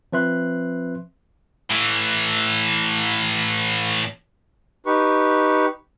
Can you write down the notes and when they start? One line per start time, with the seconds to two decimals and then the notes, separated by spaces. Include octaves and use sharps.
0.13 F3 C4 B4 E5 C6 F#6
1.70 A2 E3
4.86 D#4 G4 B4 C#6